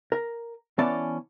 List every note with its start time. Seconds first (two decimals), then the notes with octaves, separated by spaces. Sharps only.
0.12 A#4
0.78 E3 B3 C#4 D5 A5